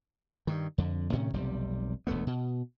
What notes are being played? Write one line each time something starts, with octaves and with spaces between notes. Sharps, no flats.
G2 D#3
F2 D3
A2 C3 D#3 C#4
F1 B1 C3 G3
E1 D2 A3 B3
B2